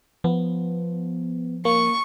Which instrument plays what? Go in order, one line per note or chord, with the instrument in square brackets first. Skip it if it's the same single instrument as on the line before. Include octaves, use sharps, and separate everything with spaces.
[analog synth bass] F3 [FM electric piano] B3
[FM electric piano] A#3 [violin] C#6